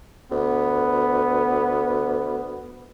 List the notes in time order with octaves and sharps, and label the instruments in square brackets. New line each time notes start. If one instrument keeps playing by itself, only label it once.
[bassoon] D2 [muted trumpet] B3